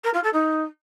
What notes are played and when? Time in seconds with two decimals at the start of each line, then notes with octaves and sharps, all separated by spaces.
0.04 A#4
0.14 F4
0.23 A4
0.33 D#4